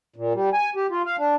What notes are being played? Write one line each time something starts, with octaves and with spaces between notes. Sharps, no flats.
A#2
G3
G#5
G4
F4
F5
D4